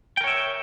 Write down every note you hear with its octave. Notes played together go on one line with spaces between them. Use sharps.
A#4 C#5 E5 G5